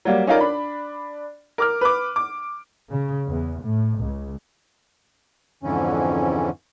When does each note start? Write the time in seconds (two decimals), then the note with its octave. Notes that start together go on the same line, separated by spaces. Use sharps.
0.05 F#3 G3 A#3
0.27 C#4 D#4 F4 A#4 D5
0.40 D4 B5
1.58 A#4 D6 F6
1.81 B4 D6
2.16 D6
2.91 C#3
3.27 E2
3.63 A2
3.98 C#2
5.63 F2 G#2 D3 E3 C#4